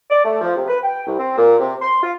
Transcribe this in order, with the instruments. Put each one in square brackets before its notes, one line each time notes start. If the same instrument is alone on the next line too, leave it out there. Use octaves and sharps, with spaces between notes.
[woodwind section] D5
A3
F3
C3
B4
G5
C2
C4
A#2
C3
C6
F4